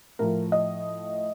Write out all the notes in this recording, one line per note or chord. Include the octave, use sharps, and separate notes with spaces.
A2 F3 A#4
D#5